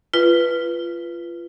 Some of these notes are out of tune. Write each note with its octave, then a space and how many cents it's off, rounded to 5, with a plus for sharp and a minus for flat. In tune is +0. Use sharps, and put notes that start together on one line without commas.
F4 -25 B4 -5